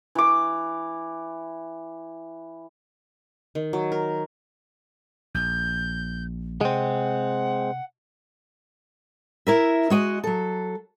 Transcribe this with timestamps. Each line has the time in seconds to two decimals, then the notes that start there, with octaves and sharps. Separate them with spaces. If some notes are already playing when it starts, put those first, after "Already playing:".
0.15 E3 D6
3.55 D#3
3.73 F#3
3.92 A#4
5.35 A#1 G6
6.61 C3 G#3 C4 F#5
9.47 E4 A#4 E5
9.90 G#3 F#4 D#5
10.24 F#3 A4